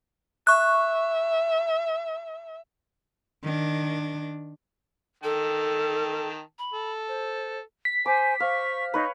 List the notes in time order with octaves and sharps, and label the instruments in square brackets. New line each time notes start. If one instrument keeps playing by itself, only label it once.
[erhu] E5 [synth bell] C#6 F#6
[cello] D#3 D4
[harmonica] D#3 G5 A5 [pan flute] A4
[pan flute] B5
[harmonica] A4
[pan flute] C5
[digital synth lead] B6
[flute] C5 [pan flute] G#5 [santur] D6
[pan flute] C5 [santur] F5 [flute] C#6
[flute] D#4 [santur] B4 C#5